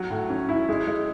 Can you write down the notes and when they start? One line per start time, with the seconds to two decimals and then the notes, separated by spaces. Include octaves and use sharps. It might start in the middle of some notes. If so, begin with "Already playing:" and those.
Already playing: F#3
0.10 A2
0.30 C#4
0.49 E4
0.69 G#3
0.87 G#3